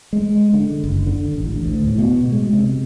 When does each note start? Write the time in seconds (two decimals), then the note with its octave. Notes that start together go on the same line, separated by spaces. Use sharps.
0.13 G#3
0.53 D3
0.83 F#1
1.06 D3
1.36 A1
1.64 D2
1.87 A2
1.99 B2
2.32 G#3
2.53 C3